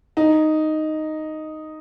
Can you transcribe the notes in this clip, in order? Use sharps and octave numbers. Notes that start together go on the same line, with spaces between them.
D#4